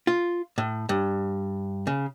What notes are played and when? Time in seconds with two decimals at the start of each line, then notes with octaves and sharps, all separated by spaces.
0.07 F4
0.58 A2
0.89 G2
1.87 C#3